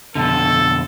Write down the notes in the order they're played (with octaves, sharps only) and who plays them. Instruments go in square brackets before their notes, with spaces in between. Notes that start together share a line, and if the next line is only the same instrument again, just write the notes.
[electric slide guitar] F2 B2 D3 [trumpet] A4